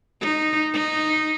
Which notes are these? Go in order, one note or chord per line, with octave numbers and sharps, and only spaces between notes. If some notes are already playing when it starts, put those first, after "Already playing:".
D#4
D#4